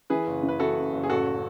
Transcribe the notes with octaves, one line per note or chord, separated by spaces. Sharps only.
E3 G#4 B4
F#1
E3
B4
E3 F#4 A4
F#2
F#1
G#4
A1 F#4 A4